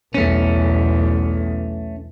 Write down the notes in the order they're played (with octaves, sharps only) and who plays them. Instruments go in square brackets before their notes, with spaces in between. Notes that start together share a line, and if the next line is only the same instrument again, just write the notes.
[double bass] B1 E2 [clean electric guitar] A3 C#4